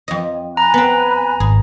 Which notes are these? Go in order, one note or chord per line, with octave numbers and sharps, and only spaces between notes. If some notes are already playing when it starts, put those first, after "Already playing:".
F2 D#5
G#5 A#5 B5 F#6
B3 C4
G#1 G#4